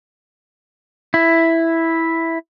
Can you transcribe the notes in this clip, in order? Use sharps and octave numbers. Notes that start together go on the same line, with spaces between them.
E4